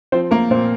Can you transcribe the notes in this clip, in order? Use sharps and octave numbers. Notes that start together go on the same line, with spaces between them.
F3 C4 C5
A#3 A#4
A#2 C4 C5